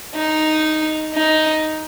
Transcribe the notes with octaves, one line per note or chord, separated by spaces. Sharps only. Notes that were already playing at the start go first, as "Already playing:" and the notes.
D#4
D#4